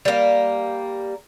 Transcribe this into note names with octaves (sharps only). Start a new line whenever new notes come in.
G3 A#3